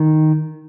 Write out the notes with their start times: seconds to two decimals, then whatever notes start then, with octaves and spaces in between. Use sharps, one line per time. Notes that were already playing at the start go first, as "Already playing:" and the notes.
Already playing: D#3